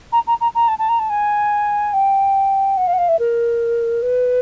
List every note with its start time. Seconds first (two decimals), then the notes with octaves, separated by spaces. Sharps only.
0.12 A#5
0.27 A#5
0.40 A#5
0.54 A#5
0.68 A5
0.78 A5
0.89 A#5
0.99 A5
1.09 G#5
1.93 G5
2.77 F#5
2.87 F5
2.93 F#5
2.98 F5
3.08 E5
3.19 A#4
4.02 B4